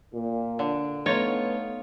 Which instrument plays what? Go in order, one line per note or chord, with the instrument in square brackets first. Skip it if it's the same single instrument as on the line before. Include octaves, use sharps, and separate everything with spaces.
[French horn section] A#2
[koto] D3
[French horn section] A3 B3 [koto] D#4 F4 C#5